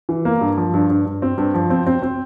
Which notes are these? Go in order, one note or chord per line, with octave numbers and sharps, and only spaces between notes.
E3
A#3
G2
F3
G2
G2
G2
C4
G2
F3
C4
C4
C4